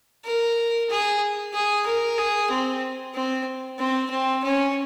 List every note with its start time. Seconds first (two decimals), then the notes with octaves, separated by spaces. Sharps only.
0.25 A#4
0.90 G#4
1.53 G#4
1.86 A#4
2.18 G#4
2.51 C4
3.15 C4
3.79 C4
4.11 C4
4.44 C#4